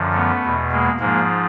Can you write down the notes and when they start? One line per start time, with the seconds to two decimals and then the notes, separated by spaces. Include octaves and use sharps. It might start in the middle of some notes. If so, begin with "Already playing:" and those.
Already playing: F#2 D3 F3
0.14 A3 B3
0.43 E2 B2
0.71 G#3 A#3
0.99 G#2 F3 G#3 A#3